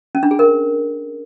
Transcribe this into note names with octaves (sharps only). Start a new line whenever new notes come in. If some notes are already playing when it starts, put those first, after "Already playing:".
C#4
D4
G#4
A#4